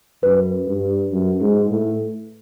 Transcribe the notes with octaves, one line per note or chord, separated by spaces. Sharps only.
F#2 B4
G2
F#2
G#2
A2